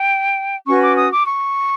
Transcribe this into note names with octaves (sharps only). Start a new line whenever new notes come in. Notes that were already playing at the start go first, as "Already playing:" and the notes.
Already playing: G5
C#4 F#4 B4 C#6
D6
D#6
D6
C#6